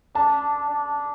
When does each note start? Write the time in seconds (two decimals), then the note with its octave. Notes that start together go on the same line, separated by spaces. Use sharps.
0.15 D4 A5
0.70 D4